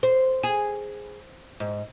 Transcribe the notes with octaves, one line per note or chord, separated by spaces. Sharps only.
C5
G#4
G#2